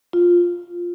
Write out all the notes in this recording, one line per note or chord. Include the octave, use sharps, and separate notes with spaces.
F4